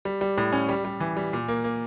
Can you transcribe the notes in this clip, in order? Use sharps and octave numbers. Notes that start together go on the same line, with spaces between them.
G3
G3
A2
C#4
G3
G3
E3
G3
A#2
A#3
A#3